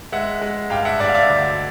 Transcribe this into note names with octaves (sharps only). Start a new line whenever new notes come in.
G#3 E5 F#5
G#3
G2 F5 G5
E5 F#5
G2 D5 E5
F5
D5 E5
D2